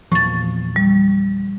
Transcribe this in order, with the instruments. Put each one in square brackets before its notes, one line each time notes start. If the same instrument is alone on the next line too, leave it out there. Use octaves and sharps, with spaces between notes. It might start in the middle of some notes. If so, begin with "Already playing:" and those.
[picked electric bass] E2 A#2 F3 [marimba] C#6 A6
[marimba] G3